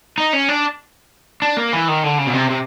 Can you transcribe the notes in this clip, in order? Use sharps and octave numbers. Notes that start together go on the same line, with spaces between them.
D#4
C#4
D4
D4
A#3
E3
D#3
D3
C#3
B2
C3
C3